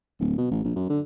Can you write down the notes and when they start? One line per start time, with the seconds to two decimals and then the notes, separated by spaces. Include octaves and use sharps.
0.20 D1
0.38 B2
0.51 A1
0.65 A#1
0.76 F#2
0.90 D3